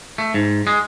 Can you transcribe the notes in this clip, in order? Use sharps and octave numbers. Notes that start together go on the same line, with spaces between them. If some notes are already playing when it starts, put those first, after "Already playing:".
A3
G#2
G#3